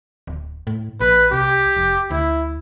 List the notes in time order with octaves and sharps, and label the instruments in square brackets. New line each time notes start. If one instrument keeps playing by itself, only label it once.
[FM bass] D1
A2
[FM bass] A#1 [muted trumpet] B4
[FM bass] C2 [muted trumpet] G4
[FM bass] F1
[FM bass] D2 [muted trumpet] E4